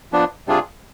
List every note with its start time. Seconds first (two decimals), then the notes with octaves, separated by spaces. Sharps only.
0.12 F3 B3 D4
0.47 C3 G3 D4 F4 G#4